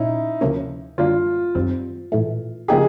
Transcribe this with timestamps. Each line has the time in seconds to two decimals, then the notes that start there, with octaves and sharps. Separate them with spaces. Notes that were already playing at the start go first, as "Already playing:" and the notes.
Already playing: A#2 C#4 D#4 E4
0.41 D2 C3 F3 A#3 C#4
0.98 F#2 D3 G3 A#3 D4 F4
1.55 F#2 D#3 G3 C4
2.12 A#1 A2 E3 A3
2.68 C#3 F3 A#3 D#4 G4 G#4